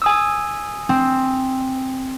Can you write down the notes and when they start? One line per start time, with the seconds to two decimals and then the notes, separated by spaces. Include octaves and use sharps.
0.02 G#5 D#6 E6
0.89 C4